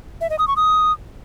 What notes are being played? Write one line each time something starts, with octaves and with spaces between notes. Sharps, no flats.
E5
D#5
D#6
C#6
D#6